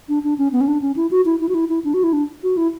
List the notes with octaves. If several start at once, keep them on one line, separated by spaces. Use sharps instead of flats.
D4
D4
C#4
B3
C#4
D4
C#4
E4
F#4
E4
E4
F#4
E4
E4
D4
F#4
E4
D4
F#4
E4